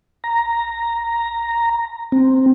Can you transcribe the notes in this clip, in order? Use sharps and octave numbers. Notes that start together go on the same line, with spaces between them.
A#5
C4